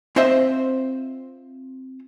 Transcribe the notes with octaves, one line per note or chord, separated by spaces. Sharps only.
C4 F4 C5 D#5 E5